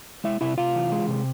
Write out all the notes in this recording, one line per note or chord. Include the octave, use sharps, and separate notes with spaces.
G#3 E4 E5
C3 E4 E5
C3 F4 F5
E3
G#3
C3